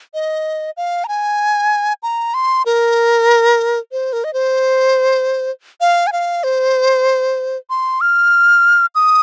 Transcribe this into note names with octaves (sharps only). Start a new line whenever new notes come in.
D#5
F5
A#5
G#5
A#5
C6
A#4
C5
A#4
D#5
C5
F5
G#5
F5
C5
C6
F6
D#6